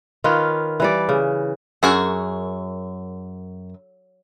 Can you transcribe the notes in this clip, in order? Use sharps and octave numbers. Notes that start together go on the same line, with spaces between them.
D#3 F4 B4 C#5
E3 G3 D5
C#3
F#2 F#4 G#4 A#4